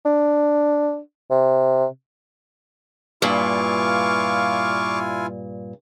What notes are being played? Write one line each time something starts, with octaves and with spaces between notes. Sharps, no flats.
D4
C3
G2 A#2 E4 F4 F5 G#5 C#6 D6